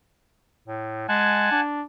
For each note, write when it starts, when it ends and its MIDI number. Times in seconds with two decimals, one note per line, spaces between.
0.68 1.07 45
1.09 1.47 56
1.09 1.60 78
1.09 1.60 80
1.09 1.60 81
1.51 1.82 62